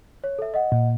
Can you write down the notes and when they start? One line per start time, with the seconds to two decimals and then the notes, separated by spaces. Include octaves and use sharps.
0.24 C#5
0.39 A4 E5
0.54 D#5 F#5
0.72 A#2